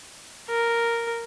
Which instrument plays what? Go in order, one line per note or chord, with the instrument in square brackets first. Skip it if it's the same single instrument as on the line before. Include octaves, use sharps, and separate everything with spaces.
[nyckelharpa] A#4